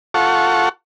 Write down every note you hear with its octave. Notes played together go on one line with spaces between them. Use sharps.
F4 A4 F#5 C#6